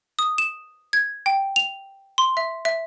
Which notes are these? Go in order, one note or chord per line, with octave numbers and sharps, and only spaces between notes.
D#6
E7
G#6
G5
F7
C6
E5
E5